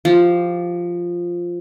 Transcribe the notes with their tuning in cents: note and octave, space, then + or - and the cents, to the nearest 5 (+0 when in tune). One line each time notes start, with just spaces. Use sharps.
F3 +0 G4 +0